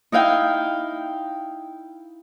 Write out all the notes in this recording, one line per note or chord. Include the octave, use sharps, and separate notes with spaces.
D#4 E4 F5 G5